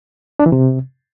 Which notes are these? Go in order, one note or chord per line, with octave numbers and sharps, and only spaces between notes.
D4
E3
C3